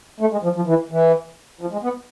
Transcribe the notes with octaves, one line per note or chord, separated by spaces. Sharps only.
A3
G#3
F3
F3
E3
E3
F3
G#3
B3